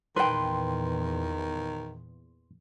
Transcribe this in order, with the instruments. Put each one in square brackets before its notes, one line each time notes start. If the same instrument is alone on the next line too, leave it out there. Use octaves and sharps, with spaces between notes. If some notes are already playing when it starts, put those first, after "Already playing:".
[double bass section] E2 A#2 [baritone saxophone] D#3 [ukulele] B4 G5 [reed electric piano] C6